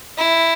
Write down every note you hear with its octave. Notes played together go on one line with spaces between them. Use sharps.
E4